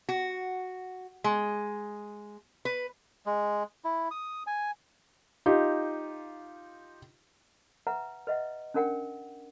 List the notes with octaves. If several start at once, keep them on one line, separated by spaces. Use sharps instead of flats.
F#4
G#3
B4
G#3
E4
D#6
G#5
D#4 F4 G4
B4 E5 F#5 A#5
B4 D#5 E5 F#5
C#4 D4 A#4 F#5 G5